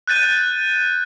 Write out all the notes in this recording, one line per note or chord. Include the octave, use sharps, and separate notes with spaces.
F#6 G6 A6 D#7